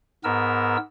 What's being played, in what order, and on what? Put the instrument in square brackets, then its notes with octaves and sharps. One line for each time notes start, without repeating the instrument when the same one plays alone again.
[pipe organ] G#2 B3 A#4 E6